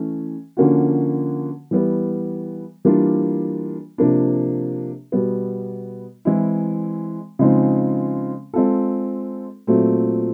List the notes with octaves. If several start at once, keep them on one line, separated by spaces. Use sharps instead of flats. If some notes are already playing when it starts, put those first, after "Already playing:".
Already playing: E3 A3 C#4
D3 F3 A#3 C#4 F#4
E3 G3 B3
E3 G3 A#3 D4 F4
C3 F3 A#3 D4
B2 G3 B3
E3 G#3 C4 E4
C#3 F3 G#3 C4 D#4
G#3 C4 F4 A4
A#2 F#3 A3 C4